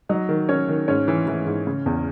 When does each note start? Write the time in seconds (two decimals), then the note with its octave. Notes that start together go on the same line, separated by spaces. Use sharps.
0.09 F#3 D#4 D#5
0.29 D#3
0.49 D#3 C#4 C#5
0.69 D#3
0.88 G#2 C#4 C#5
1.08 E3
1.28 E3
1.46 G#2
1.67 C#3
1.86 E2